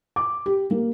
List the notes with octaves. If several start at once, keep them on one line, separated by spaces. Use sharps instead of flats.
D6
G4
A#3